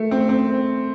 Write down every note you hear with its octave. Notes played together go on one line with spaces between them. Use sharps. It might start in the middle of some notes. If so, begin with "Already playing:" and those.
Already playing: A3
C4
C4